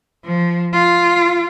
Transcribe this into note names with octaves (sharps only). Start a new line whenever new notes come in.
F3
F4